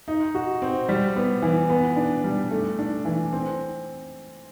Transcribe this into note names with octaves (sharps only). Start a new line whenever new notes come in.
D#4
F#4
C4
G3
B3
E3
B3
D4
G3
A3
D4
E3
C4